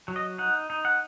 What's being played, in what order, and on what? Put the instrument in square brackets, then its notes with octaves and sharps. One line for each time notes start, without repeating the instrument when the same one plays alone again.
[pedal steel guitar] F#3
D#5
D#4 F#5
D#4
F#5